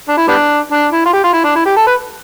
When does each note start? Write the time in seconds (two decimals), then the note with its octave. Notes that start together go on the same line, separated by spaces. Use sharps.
0.09 D4
0.18 E4
0.28 G3 B3 D4
0.72 D4
0.92 E4
1.06 F4
1.13 G4
1.23 F4
1.33 E4
1.44 D4
1.55 E4
1.66 G4
1.76 A4
1.86 B4